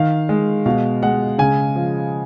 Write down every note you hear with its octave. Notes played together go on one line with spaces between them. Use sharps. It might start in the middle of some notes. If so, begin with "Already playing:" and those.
Already playing: D#3 F5
G#3
B2 F5
G#3 F#5
C#3 G#5
F3